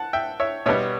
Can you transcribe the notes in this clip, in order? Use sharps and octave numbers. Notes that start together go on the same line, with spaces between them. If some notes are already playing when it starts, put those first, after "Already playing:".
Already playing: F#5 A5
E5 G5
C#5 E5
B2 G3 B3 C#5 E5